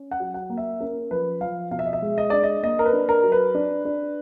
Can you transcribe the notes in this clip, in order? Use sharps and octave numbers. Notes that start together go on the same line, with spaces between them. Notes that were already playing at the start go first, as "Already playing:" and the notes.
Already playing: C#4
F#5
F#3
F#5
A#3
E5
C#4 A#4
F3 B4
F3 F5
B2 F5
E5
D#5
E5
G#3
D#5
D4 D5
D#5
A#3 D#5
A#4
B4
D4
A#4
F#3
B4
D4
D4